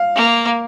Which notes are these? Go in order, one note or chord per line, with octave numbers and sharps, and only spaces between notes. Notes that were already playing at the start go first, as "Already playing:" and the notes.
Already playing: F5
A#3